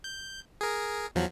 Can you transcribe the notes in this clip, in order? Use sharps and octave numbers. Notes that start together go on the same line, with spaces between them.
G6
G#4 A#4
E2 F3 F#3